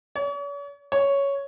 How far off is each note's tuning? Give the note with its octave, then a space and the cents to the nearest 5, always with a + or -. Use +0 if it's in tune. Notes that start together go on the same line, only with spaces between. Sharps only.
C#5 +45
C#5 +5